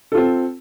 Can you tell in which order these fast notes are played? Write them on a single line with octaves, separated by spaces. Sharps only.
A4 F4 C4